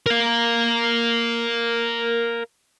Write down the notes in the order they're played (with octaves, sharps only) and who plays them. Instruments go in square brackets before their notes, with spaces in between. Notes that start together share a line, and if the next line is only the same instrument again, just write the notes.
[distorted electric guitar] A#4 F5